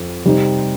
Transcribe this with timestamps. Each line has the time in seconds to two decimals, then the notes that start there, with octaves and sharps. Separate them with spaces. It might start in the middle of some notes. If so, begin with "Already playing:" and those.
Already playing: F2 F3
0.25 C3 G3 C4 D#4